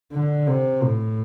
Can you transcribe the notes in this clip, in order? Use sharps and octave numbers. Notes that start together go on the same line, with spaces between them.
D3
C3
A2